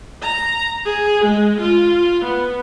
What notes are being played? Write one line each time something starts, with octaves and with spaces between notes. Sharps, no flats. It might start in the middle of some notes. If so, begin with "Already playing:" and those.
A#5
G#4
G#3
F4
B3